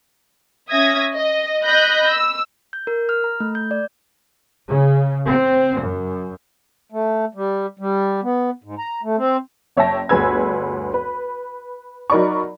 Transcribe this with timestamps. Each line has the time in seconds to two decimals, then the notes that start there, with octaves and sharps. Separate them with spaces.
0.70 C#4 E5 D#6 G#6 A#6
1.14 D#5
1.63 D#5 B5 F#6 G6 A#6
2.11 E6
2.73 G6
2.87 A#4
3.09 F6
3.24 A#5
3.40 A3
3.55 G6
3.71 D5
4.67 C#3
5.29 C4
5.79 F#2
6.92 A3
7.35 G3
7.79 G3
8.23 B3
8.64 G#2
8.78 A#5
9.03 A3
9.17 C4
9.77 F#1 C#5 E5 G5 A5 A#6
10.09 G1 D2 G#4 B4 E6 G#6
10.94 B4
12.10 F#3 D#4 A#4 D5 B5 C#6